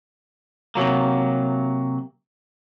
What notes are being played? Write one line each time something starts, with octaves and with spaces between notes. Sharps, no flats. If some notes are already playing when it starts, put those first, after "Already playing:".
C3 F3 F#3 A#3